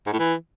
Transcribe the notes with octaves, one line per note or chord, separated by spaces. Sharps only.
G#2
A2
E3